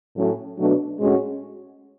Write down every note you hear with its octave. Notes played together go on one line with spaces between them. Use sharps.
A2 F#3 A3 C#4
B2 F#3 A3 D4
A2 G#3 C#4 F#4